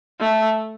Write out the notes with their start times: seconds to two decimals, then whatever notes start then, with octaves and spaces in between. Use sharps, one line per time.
0.20 A3